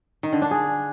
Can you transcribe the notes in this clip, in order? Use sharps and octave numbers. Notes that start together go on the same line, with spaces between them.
D#3
D3
D4
G#4